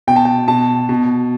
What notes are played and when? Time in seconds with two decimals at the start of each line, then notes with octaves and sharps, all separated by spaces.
0.07 B2 G5
0.16 A5
0.25 G5
0.48 B2 A5
0.89 B2